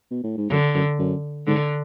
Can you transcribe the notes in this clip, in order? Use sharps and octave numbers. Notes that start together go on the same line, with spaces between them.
B2
A2
G#2
F#2 D3
F#2
F#2
G#2 D3